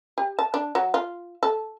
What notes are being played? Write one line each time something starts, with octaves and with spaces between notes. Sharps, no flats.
G4
A5
D4
F#3
F4
A4